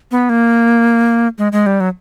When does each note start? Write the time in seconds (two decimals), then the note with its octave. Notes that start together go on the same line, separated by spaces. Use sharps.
0.11 B3
0.29 A#3
1.38 G#3
1.52 G#3
1.66 G3
1.80 F#3